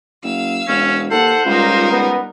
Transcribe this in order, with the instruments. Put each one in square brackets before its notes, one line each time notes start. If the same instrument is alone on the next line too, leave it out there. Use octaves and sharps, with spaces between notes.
[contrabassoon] F#1 [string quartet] F5 E6
[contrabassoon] E1 [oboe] C#4
[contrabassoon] D#2 [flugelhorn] A4 [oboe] C5 [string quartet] F#5
[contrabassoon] C#2 [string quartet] G3 D#4 A#4 [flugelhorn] F4
[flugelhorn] B3